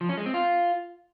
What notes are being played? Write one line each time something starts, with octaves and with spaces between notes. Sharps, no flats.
F3
C#4
G#3
C4
F4